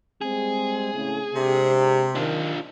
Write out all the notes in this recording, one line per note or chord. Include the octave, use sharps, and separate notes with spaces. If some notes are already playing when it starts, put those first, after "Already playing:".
G3 G#3 C4 G#4
A2 C#3
C3 G#3 D4 G4
D#3 D4 F4